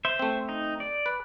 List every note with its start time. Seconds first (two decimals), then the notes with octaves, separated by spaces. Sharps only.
0.05 C5 E5
0.19 A3 C4
0.49 D#4
0.80 D5
1.06 B4